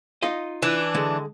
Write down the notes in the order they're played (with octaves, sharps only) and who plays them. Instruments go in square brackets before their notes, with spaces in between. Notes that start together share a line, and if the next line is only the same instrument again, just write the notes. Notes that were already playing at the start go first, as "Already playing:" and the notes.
[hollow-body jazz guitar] D#4 F4 D#5
[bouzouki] E3 D4
[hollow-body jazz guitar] D3 G#3